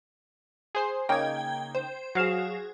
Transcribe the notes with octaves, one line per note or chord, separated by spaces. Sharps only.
G#4 C5 C7
C#3 A#3 D#4 G5 G#6
C5
F#3 F#4 G#4 F5 E7